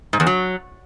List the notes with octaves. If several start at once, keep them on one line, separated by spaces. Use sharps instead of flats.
G#2
E2
F#3